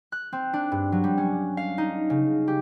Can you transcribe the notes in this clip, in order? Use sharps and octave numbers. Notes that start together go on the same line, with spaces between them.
F#6
C4
D4
G2
F#3
G3
C#4
F5
D#4
C#3
G4